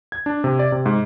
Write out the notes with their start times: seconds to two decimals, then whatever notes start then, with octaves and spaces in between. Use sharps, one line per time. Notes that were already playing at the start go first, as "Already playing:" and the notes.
0.12 G#6
0.26 D4
0.44 C3
0.59 D5
0.72 C3
0.86 G#2